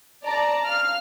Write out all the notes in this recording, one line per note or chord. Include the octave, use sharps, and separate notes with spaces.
D5 A5 A#5
F5 F6